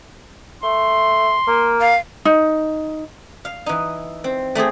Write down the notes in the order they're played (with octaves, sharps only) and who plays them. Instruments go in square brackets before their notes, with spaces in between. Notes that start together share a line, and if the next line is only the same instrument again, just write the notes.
[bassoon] A3 [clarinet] C6
[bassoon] A#3
[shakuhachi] F5
[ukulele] D#4
[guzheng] F5
E3 D#4
C4
A3 C4 G4 G#4